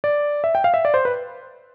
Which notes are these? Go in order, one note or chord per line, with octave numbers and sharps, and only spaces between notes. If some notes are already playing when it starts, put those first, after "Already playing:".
D5
E5
G5
F5
E5
D5
C5
B4